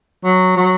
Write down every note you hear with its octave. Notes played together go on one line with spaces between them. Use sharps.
F#3
F#3